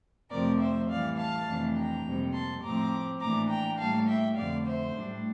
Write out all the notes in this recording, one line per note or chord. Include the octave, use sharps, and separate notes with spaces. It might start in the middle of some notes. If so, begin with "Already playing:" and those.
F2 C3 F3 A3 C4 A#4 D5
C5 E5
A2 E3 G3 D5 F5
F5 A5
F2 C3 E3 A3 D4
G5 A#5
F2 C3 G3 A#3
A5 C6
A2 F3 A3 C4 A#5 D6
A2 E3 A#3 D4 A#5 D6
G5 A#5
A2 G3 A#3 F5 A5
E5 G5
F2 D3 A3 D5 F5
C5 E5
A2 G3 D4